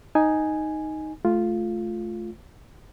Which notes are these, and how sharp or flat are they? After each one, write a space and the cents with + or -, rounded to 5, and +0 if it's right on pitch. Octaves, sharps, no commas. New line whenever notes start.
D#4 +0 G#5 +0
A3 -25 F4 +0